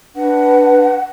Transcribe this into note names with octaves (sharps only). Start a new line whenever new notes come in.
D4 B4 F#5